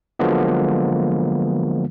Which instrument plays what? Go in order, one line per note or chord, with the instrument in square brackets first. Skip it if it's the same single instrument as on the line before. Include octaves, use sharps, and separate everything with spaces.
[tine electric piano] D3 F3 F#3 G#3 A#3 B3